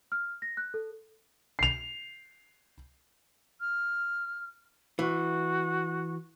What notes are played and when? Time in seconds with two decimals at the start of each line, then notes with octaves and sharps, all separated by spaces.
0.12 F6
0.42 A#6
0.57 F#6
0.74 A4
1.59 C7 F7
3.60 F6
4.99 E3 F#4